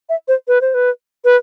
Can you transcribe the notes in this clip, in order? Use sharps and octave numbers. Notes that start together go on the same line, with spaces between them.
E5
C5
B4
C5
B4
B4